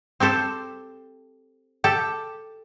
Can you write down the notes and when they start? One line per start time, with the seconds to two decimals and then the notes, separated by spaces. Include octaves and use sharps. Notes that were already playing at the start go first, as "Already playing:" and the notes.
0.20 C4 G4 A4 C5
1.84 G4 A4